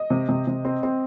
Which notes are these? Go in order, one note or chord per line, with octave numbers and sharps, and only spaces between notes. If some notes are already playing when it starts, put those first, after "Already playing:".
Already playing: D#5
C3
C3
C3
C4
C4